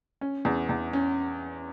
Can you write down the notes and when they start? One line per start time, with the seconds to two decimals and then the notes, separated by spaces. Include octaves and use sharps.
0.21 C#4
0.45 E2
0.69 E2
0.93 C#4